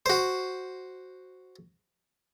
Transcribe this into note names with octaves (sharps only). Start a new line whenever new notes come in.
F#4 C5